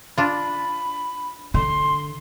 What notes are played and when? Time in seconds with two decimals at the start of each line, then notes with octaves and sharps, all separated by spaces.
0.18 D4 F4 B5
1.54 D3 C6